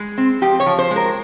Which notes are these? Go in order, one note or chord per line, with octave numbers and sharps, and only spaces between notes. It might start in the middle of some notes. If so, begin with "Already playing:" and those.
Already playing: G#3
C4
F3 G4
C#5
F3
C5
G#3
A#4